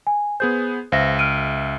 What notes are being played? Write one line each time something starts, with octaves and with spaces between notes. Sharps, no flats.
G#5
B3 G#4 C5 G6
C#2 C5 E5 F5 A#6
F6 D7 D#7